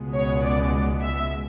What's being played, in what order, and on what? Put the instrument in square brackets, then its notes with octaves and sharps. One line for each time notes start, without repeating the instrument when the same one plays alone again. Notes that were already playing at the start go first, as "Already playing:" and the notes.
Already playing: [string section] C#2 B2 G#3 B3
C#5
D5
E5